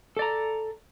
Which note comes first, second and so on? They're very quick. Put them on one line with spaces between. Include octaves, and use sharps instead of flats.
A4 D5 A#5